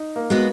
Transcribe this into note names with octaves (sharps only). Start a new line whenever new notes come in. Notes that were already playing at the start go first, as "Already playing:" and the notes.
Already playing: D#4
A#3
G#3 B3 F#4 B4